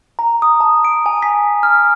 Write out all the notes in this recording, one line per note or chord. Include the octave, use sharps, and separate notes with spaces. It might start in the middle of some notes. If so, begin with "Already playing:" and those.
A#5
D#6
A5
D7
G#5
B6
F6